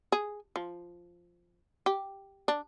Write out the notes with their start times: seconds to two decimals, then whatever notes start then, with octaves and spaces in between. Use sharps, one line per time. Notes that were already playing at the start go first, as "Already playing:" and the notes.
0.12 G#4
0.56 F3
1.86 G4
2.48 D4